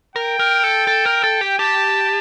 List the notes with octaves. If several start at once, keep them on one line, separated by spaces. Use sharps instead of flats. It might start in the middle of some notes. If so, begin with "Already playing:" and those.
A#4 G5
A#4
A4
A4
A#4
A4
G4
G4 A5